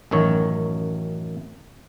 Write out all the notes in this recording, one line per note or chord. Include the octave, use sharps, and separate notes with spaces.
A1 F#2 D#3 F#3 C#5